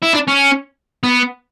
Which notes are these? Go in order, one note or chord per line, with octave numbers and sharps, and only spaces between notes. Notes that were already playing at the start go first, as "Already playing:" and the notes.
E4
D4
C#4
B3